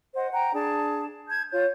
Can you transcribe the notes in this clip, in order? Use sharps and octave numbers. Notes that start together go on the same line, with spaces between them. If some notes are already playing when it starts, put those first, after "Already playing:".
C5 D#5 F#5
F#5 G5 A#5
D4 G#4 A5
A5 G6 G#6
F4 C#5 G6